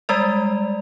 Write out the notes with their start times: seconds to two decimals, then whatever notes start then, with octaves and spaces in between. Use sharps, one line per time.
0.09 G3 G#3 D5